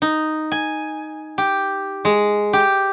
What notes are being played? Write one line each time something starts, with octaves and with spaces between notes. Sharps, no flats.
D#4
G#5
G4
G#3
G4